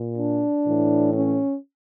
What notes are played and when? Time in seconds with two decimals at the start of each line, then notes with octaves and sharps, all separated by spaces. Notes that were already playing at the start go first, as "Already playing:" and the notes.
Already playing: A#2
0.17 D4
0.65 A2 E3
1.13 C#4